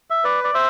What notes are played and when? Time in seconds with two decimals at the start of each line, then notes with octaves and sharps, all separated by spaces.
0.10 E5
0.24 B4 D5
0.44 D5
0.54 C5 E5